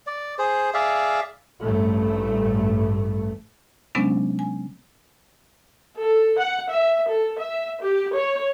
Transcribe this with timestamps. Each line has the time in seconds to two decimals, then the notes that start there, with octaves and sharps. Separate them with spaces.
0.07 D5
0.39 G#4 C5
0.74 G#4 D5 E5 F5
1.62 A1 G2 A3
3.95 C3 F#3 G#3 B3 C#4 D4
4.39 G#5
5.98 A4
6.38 F#5
6.71 E5
7.09 A4
7.38 E5
7.82 G4
8.16 C#5